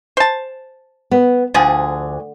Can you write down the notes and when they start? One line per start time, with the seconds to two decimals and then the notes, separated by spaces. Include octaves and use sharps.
0.17 C5 A5
1.11 B3
1.54 D2 D3 F3 G#4